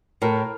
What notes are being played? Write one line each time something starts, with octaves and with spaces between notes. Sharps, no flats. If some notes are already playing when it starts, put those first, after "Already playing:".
A2 A#4